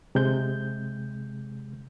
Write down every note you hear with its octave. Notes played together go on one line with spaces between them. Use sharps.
C3 G#3 G6